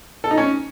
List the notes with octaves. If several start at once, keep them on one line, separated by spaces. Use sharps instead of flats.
A4
D#4
C#4